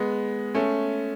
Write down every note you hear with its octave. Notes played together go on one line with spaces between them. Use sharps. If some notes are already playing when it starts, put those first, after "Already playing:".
Already playing: G#3 B3
A3 C#4